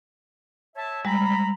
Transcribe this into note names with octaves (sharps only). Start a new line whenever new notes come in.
C#5 E5 A5
G3 G#3 A#5 B5